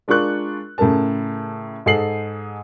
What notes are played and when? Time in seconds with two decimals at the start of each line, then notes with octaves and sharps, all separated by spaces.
0.08 G#3 D4 F4 A#4 C#6 F#6
0.78 A2 C#3 A4 A#4 A5
1.86 G#2 G#4 A4 C7 F#7